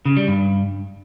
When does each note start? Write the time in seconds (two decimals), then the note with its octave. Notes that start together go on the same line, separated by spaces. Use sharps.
0.05 C#3
0.17 G3
0.28 G2